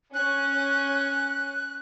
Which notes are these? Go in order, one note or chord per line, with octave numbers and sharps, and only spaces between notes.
C#4 F#6